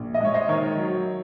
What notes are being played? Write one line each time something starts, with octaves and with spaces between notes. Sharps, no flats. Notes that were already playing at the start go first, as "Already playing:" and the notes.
Already playing: A#1
D#5
G#3 C#5
C5 D#5
D#3 A#4 C#5
F#3